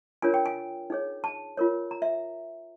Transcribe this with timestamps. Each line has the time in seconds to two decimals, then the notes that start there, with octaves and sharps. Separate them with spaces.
0.22 D4 F4 A#4 C#5 G#5
0.34 G5
0.46 G#5
0.90 D#4 G#4 C#5
1.24 A5
1.57 F4 A#4 C#5
1.91 A#5
2.02 E5